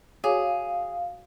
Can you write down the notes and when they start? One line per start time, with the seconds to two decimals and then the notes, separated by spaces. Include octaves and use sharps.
0.24 F#4 G#4 C#5 F5 D6